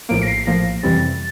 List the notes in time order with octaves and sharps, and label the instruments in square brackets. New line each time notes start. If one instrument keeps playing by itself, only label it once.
[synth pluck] A#1 A2 F3 A#3 [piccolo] D7
[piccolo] A#6
C7
[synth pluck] A#1 A2 F3 A#3 [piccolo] A#6
[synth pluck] F2 C3 E3 G3 C4 [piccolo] A6